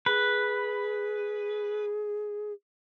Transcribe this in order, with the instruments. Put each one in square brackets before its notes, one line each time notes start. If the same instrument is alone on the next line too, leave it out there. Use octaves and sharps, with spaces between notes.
[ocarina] G#4 [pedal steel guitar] B4